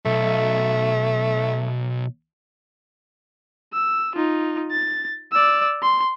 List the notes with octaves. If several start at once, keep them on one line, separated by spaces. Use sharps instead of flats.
B1 A3
E6
D#4 F4
A6
D5 E6
C6